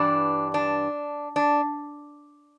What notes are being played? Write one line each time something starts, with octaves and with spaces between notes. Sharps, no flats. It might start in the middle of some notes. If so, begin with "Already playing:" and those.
Already playing: G2 E3 G3 D4
D4
D4